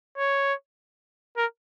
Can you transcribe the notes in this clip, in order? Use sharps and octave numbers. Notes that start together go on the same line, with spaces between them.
C#5
A#4